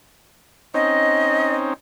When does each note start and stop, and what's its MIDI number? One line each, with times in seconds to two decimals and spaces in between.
0.74 1.74 60
0.74 1.74 61
0.74 1.74 63
0.74 1.54 75